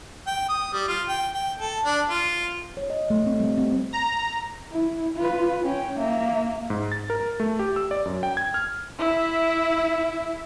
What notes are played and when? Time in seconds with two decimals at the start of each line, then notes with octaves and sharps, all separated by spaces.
0.27 G5
0.49 D#6
0.73 G3
0.88 F4
1.08 G5
1.34 G5
1.59 A4
1.85 D4
2.10 F4
2.77 C#5
2.90 D#5
3.10 A3
3.27 C4
3.40 G3
3.58 C4
3.93 A#5
4.72 E4
5.17 F4 B4
5.65 C#4 G5
5.99 A#3 E5
6.70 G#2
6.92 A6
7.10 A#4
7.40 A3
7.59 G4
7.76 E6
7.91 D5
8.06 F#2
8.23 G5
8.37 G#6
8.54 F6
8.99 E4 E5